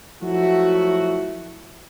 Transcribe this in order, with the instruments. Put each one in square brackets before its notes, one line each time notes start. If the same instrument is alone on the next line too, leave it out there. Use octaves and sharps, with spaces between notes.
[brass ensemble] F3 F#3 A3 E4 F#4